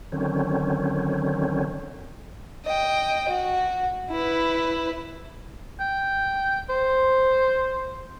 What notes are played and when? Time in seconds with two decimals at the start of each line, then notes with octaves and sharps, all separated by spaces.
0.12 D3 D#3 F#3 C4 C#4
2.65 D#5 G5
3.29 F#4
4.10 E4 B4
5.80 G5
6.70 C5